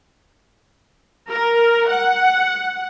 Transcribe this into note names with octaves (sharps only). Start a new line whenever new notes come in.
A#4
F#5